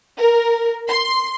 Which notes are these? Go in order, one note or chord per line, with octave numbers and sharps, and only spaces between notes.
A#4
C6